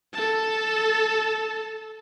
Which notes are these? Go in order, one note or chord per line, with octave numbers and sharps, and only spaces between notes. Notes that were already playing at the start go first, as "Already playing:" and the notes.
A4 A5